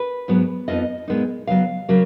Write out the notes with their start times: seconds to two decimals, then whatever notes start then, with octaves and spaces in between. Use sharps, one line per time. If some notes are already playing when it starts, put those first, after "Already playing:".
Already playing: B4
0.28 G#2 F#3 B3
0.68 F2 F3 B3 D#4 D#5
1.08 A#2 G#3 B3 D#4
1.47 C#3 F#3 B3 F5
1.89 C#3 F#3 A#3